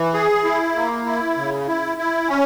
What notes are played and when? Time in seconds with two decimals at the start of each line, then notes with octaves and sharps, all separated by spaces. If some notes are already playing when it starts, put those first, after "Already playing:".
Already playing: E3
0.14 G#4
0.45 E4
0.76 A#3
1.06 E4
1.36 C#3
1.67 E4
1.97 E4
2.28 C#4